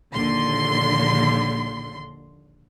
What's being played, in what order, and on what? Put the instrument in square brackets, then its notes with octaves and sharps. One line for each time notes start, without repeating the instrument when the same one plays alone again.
[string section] A#1 D#2 D3 C6